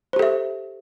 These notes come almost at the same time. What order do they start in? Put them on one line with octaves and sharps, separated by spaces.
C5 G4 A4 E5